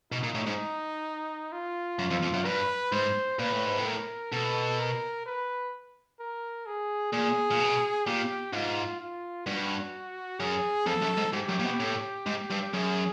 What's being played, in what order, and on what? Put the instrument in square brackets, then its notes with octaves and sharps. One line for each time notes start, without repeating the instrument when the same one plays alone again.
[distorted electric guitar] B2 [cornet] D#4
[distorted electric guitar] A#2
A2
G#2
[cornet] F4
[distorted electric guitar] F#2
F2
F2
F#2
[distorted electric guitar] G2 [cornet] B4
[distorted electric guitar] G#2 [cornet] C5
[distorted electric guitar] A#2 [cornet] B4
[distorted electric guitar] A2
G#2
A2
[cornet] A#4
[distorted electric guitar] B2 [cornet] A4
[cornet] A#4
B4
A#4
G#4
[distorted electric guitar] A#2 [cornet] G#4
[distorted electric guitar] A#2
B2
[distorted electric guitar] A#2 [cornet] G4
[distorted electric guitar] G#2 [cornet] F4
[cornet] F4
[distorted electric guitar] G2 [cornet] F#4
[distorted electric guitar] F#2 [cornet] G#4
[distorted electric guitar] F2 [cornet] A4
[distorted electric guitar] F#2
G#2
[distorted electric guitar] G#2 [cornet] G4
[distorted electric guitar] F#2
A#2
B2
A2
G#2
G2
[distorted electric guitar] F#2 [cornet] G#4